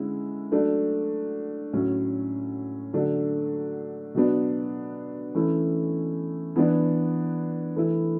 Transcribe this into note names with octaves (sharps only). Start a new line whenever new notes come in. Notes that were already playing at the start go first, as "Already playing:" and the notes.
Already playing: D3 G#3 C#4 E4
F#3 A3 D4
A2 F#3 C#4
D3 F#3 A3 D4
B2 F#3 B3 D4
E3 A3 C#4 E4
E3 B3 D4
E3 A3 E4